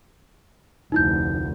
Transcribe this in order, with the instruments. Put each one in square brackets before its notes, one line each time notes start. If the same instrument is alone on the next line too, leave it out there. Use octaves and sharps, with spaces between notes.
[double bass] F1 D2 [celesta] D#4 E4 G6